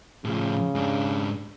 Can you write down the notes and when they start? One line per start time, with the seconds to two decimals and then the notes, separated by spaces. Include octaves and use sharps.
0.25 A2 C#3 F3
0.75 G#2 D4